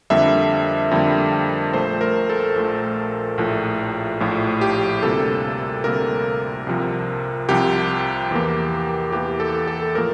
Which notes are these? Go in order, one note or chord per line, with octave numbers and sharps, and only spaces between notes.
F2 D3 G3 A#3 E5
F2 D3 G3 A#3
A#1 A#2 A3 C5
A#4
A4
A#1 A#2 A3
A#1 A2 F3
A#1 A2 F3
G4
D2 C3 G3 A#3 A4
D2 C3 G3 A#3 A#4
C2 C3 F3
C2 C3 F3 G4
E2 E3 A#3
E2 E3 A#3 G4
A4
A4
A2 F3 A#3 A#4